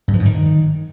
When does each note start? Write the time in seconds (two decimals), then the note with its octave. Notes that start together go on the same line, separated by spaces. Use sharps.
0.08 G2
0.14 F3
0.19 G#2
0.25 D#3